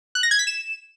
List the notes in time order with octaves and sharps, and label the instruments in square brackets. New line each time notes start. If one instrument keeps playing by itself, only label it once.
[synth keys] F#6
A#6
G#6
B6
E7